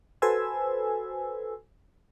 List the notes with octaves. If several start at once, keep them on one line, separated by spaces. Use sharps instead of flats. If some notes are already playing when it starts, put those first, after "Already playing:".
F#4 A4 B4 C5 G#5 E6